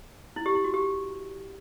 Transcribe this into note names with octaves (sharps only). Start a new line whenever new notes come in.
E4
G4
E4
F#4
G4